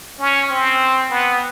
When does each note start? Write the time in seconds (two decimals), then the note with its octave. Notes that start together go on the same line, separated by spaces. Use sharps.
0.20 C#4
0.51 C4
1.11 B3